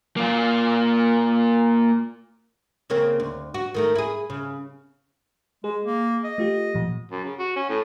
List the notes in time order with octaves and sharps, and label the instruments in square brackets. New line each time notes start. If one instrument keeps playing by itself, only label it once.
[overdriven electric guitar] A#3 F4
[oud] C#3 A#3 C4
D2
F#4
D#3 A3 A#4
E4 G#4
C#3
[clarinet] G#3 [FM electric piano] G#4
[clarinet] A#3
D#5
[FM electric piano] A3 F4 G4
A#2 F3
[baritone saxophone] F#2
C#3
F#4
C#4
A2